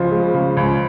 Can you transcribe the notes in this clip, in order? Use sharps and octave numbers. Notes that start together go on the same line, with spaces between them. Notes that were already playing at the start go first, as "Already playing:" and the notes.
Already playing: C#2 C#3 F3
G#3
C#3
C#2